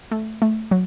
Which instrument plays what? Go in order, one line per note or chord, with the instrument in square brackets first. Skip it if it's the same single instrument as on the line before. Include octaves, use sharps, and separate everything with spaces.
[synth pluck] A3
A3
F#3